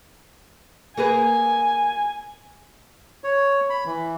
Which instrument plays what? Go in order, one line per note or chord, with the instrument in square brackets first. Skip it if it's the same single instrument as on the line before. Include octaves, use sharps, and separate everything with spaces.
[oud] A#3 G#4 B4 [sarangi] G#5
[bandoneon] C#5
B5
E3